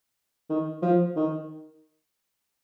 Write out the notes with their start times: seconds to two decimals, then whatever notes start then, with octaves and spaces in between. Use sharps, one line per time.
0.50 D#3
0.82 F3
1.16 D#3